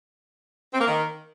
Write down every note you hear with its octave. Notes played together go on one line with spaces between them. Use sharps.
C4
A#3
D#3